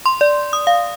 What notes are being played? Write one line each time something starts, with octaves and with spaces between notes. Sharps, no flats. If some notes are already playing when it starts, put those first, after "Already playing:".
C6
D5
D#6
F5